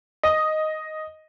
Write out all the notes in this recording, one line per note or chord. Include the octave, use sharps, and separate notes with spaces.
D#5